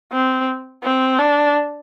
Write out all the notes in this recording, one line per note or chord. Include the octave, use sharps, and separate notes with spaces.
C4
C4
D4